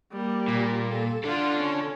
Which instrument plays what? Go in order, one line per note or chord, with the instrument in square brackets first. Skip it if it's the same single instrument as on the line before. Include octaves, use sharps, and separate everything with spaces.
[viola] G3 A#3
[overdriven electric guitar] A#2
[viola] A4
[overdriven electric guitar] D3 A4 [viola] D4 F4
[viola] C#4